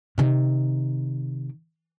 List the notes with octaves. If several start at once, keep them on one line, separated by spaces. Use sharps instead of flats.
C3 D#3